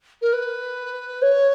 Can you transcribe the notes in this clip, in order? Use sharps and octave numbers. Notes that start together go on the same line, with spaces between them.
A#4
B4
C#5